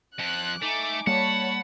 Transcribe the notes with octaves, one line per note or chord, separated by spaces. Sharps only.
F2 F3 F#6
A3 D#4 G#5 D6
G3 A#3 C#5 F#5 A5 B5